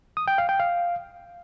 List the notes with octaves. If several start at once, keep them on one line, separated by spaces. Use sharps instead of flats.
D#6
G5
F5
G5
F5